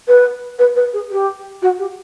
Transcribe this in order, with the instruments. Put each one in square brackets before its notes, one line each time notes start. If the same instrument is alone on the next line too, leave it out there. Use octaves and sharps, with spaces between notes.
[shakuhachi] B4
B4
B4
G#4
G4
F#4
G4